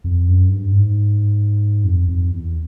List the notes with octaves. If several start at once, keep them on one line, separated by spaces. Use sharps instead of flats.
F2
F#2
G2
G#2
F2
F2
E2